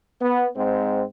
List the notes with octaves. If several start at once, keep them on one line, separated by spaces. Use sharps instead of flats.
B3
G#2 C4